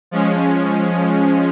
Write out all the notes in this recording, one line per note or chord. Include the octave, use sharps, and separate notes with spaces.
F3 G#3 C#4